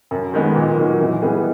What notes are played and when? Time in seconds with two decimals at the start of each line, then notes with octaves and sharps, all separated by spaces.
0.11 F#2
0.34 D#3 G#3 B3 D#4
0.55 A#2
0.77 F#3 A#3 D#4
1.00 E3
1.22 G3 B3 D#4 G#4